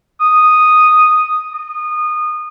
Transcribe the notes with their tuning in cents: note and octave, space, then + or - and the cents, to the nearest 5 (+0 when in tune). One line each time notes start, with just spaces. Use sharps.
D#6 -5
D#6 -25